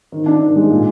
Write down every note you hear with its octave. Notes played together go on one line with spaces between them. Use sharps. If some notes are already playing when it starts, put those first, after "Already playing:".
D#3
D4
D#3
G#3
A#2